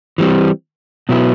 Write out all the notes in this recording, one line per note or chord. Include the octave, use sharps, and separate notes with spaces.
E3 G3 C4
B2 F#3 B3 E4